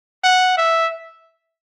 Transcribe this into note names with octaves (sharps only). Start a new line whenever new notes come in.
F#5
E5